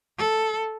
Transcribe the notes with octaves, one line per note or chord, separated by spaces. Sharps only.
A4